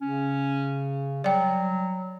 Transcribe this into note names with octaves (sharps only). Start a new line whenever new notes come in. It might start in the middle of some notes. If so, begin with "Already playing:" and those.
C#3 C#4
F#3 G3 D5 G5